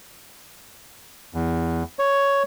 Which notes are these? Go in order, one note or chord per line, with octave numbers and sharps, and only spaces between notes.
E2
C#5